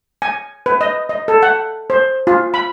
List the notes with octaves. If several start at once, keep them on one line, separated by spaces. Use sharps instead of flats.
G#5
B4
D#5
D#5
A4
F#5
C5
F4
B5